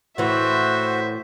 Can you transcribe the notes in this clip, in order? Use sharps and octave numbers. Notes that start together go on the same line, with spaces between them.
A2 E3 F#4 C5 E5